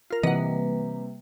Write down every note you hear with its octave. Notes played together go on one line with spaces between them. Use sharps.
F4 A#4
C3 E3 G3 A#3 B4 D#5 F#5